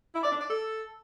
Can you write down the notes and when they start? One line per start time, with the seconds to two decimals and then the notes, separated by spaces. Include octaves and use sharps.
0.14 E4
0.23 D5
0.32 D4
0.41 D5
0.50 A4